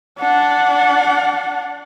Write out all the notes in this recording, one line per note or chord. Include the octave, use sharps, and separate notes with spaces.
D4 F#5